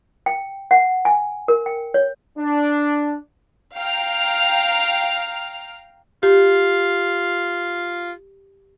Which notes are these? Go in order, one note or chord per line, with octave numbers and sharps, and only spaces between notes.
G5
F#5
G#5
A#4
G5
C#5
D4
F5 G5 A#5 F6
F4 G4